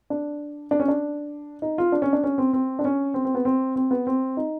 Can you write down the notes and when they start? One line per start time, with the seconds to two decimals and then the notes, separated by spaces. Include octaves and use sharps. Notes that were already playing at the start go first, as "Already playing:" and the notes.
0.10 D4
0.71 D4
0.80 C#4
0.88 D4
1.62 D#4
1.78 F4
1.92 D4
2.02 C#4
2.13 D4
2.24 C#4
2.38 C4
2.53 C4
2.79 D4
2.85 C#4
3.14 C4
3.25 C4
3.35 B3
3.45 C4
3.76 C4
3.91 B3
4.07 C4
4.37 D#4